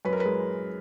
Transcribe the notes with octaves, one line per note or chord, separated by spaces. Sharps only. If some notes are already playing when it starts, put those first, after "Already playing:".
F#2 B4
A#4
B4
G#3